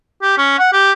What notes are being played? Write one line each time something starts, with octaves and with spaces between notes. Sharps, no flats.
G4
C#4
F#5
G4